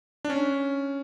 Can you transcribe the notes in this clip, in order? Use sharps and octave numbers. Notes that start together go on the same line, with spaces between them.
D4
C#4